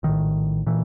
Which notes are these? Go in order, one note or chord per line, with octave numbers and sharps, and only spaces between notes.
A#1 A2 D#3
A#2 E3